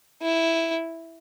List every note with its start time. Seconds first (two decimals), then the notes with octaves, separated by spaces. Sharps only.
0.22 E4